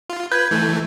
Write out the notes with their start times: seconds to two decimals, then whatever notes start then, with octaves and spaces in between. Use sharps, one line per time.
0.10 F4
0.32 B4 G6 G#6
0.51 E3 A3